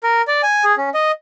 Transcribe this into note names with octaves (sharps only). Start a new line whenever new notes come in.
A#4
D5
G#5
G#4
C#4
D#5